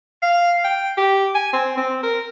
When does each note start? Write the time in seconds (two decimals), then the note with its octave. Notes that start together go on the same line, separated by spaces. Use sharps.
0.22 F5
0.64 G5
0.97 G4
1.35 G#5
1.53 C4
1.77 C4
2.03 A#4